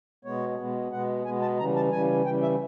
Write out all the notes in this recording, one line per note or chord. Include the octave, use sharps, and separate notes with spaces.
B2 G#3 B3 C#5
B2 G#3 B3
B2 G#3 B3 F#5
B2 G#3 B3 G#5
A5
C#3 E3 G3 A#5
A5
C#3 E3 G3 G#5
C#3 E3 G3 G5
E5